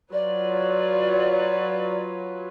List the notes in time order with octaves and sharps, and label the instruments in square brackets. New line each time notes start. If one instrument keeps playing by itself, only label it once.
[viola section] F#3 F4 B4 [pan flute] D5